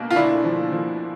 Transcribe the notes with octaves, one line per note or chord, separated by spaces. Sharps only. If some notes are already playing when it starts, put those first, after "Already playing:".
Already playing: B2 A#3
F4
D2 D4 E4
F3
F3